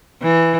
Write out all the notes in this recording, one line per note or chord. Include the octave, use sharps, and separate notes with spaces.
E3